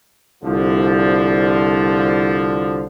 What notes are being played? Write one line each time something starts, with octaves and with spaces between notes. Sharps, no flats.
C2 D3 F3